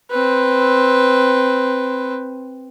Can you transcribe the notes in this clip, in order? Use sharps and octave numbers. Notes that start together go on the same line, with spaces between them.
C4 B4